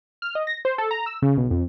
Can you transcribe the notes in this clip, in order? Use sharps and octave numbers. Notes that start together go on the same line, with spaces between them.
F6
D#5
A#6
C5
A4
A#5
E6
C#3
B1
F2